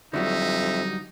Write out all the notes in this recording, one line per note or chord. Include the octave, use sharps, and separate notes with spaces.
F2 D3 F#3 G3 D#4 E5